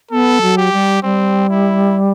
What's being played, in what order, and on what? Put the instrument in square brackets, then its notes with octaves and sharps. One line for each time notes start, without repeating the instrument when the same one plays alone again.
[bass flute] B3 [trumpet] A4
[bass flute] F#3
[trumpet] G4
[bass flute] G3
[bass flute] G3 [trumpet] C4
[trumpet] E4